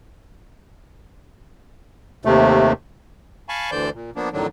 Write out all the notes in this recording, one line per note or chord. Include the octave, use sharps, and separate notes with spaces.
D#2 C3 A3
F5 G#5 A5 B5 C#6
D2 D3 E3 C5 D5 G6
A#2
F3 A#3 B3 D4
F2 A2 D3 D#3 F#3 D4